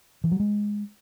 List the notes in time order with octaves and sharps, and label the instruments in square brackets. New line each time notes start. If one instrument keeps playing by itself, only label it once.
[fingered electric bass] E3
F#3
G#3